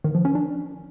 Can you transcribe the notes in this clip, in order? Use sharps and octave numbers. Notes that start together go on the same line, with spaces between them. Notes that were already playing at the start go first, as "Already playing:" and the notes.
D#3
F3
C#4
D4